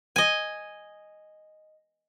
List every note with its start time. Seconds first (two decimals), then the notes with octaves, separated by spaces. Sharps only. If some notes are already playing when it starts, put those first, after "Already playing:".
0.16 D#5 G#5